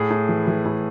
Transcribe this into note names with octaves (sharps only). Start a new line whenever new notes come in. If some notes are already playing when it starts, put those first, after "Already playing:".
Already playing: A2 G#4
A2
E3
E3
A2